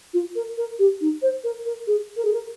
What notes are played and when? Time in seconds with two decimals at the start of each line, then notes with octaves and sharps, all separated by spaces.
0.13 F4
0.35 A#4
0.57 A#4
0.79 G4
1.00 D#4
1.22 C5
1.44 A#4
1.65 A#4
1.87 G#4
2.16 A#4
2.24 G#4
2.33 A#4